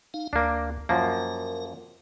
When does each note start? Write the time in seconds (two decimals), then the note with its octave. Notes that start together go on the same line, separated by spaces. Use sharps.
0.14 D#4 F5
0.33 D2 A#3 D4
0.89 F#2 F3 A#3 A#4